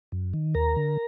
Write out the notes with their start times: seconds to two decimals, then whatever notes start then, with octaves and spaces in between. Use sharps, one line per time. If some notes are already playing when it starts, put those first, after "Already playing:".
0.12 F#2
0.34 D#3
0.55 D#2 A#4 A#5
0.76 D3